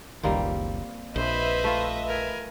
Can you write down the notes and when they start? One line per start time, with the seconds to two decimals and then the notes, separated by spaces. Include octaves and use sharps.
0.23 F#1 C#2 D#3 G3 A#3 C4
1.16 A#1 B4 C5 D#5 E5 B5
1.64 A3 F4
2.08 A#4 G#5